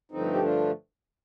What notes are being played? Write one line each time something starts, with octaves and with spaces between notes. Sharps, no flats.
G2 D3 F3 A3 C4 D#4
G4
D4 F4